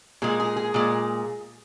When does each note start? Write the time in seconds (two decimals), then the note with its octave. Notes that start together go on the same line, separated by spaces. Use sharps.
0.22 A#2 G#3 G#4
0.40 G#4
0.56 G#4
0.74 A#2 G#3